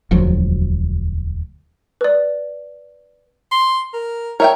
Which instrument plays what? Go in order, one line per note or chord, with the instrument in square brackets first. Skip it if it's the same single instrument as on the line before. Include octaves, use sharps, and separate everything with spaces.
[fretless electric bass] E1 D2 F3 F#3
[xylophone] B4 D5
[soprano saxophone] C6
A#4
[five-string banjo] A#4 E5 G5 [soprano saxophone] C#5